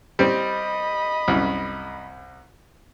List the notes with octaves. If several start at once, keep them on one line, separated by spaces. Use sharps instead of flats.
G3 C4 D#5 B5
C2 F#2